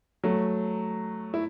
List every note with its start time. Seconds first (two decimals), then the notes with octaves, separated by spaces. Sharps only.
0.24 F#3 A3
1.34 E4